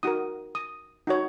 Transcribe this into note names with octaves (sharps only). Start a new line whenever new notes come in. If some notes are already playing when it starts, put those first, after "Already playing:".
D#4 F#4 A#4 D#6
D#6
D#4 F#4 C#5